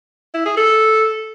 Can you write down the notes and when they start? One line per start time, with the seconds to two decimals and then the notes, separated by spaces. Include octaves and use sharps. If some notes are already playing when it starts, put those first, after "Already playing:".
0.34 E4
0.46 G#4
0.57 A4